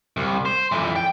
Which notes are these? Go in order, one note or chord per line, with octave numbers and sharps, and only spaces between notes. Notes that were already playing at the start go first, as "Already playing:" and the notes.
C2
C5
F2 E3
G5